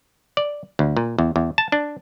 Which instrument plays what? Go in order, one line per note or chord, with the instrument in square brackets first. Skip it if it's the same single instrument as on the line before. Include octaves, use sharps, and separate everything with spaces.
[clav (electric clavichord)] D5
D2
A#2
E2
E2
A5
D4